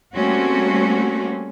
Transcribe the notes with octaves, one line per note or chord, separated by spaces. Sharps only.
G3 A3 A#3 C4 C#4 F#4